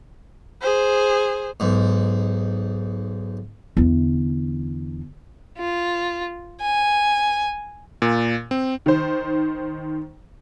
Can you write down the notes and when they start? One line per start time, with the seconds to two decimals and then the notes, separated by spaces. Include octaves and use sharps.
0.62 G#4 C5
1.60 B1 G#2
3.77 E2 D3
5.59 F4
6.61 G#5
8.02 A#2
8.51 C4
8.86 D#3 C5